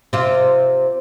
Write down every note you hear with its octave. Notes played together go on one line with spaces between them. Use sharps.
C3 F4